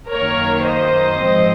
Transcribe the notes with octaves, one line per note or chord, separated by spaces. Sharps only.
F#2 D#3 A#3 A#4 C#5
C5 D#5
G#2 F3 C4